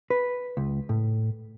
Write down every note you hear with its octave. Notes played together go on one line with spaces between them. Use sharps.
B4
C#2
A2